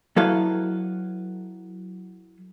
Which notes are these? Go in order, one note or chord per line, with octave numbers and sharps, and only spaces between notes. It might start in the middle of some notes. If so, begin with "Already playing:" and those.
F#3 E4 A4 B4 F5